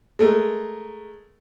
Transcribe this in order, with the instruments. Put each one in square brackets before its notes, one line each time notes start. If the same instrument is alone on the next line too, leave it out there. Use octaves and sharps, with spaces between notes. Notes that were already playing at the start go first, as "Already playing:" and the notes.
[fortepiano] G#3 A3 A#4